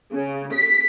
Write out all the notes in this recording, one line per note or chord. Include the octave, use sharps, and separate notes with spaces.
C#3
B6